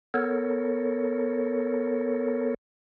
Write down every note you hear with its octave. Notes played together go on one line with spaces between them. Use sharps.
B3 A4 A#4 C#5